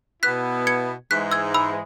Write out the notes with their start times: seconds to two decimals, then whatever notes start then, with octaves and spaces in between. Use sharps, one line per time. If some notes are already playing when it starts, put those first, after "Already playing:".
0.23 B2 B3 E4 F#6 B6
0.67 G#6 C#7
1.10 G#2 E3 G#3 F#6 B6
1.31 E6 G#6
1.54 B5 E6